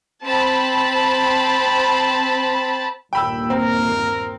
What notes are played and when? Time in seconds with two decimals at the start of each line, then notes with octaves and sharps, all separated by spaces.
0.23 C4 A5 B5
3.13 G1 D#2 A#2 G5 B5 E6
3.50 C4 A#4